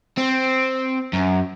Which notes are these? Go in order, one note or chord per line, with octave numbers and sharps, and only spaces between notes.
C4
F#2